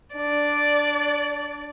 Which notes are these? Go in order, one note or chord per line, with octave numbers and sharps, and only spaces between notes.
D4 D5